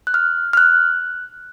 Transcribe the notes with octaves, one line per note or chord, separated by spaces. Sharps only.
F#6
F6
F6
F#6